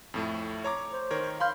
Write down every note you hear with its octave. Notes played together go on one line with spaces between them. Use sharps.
F2 A2 A3
C#5 A#5 D6
C5
D#3 A#4 C#5
F5 B5 C6 G6